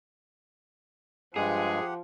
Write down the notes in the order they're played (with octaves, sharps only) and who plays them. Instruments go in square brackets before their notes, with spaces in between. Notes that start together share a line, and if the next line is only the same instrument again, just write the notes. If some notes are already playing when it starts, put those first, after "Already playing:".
[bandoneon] G2 G#3 [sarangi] F3 [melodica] G4 F#5 [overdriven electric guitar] G#4